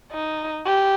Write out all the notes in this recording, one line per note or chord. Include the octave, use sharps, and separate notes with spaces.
D#4
G4